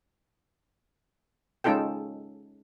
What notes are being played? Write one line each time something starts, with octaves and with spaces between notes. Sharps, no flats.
G#3 C#4 D#4 F4 A4 G5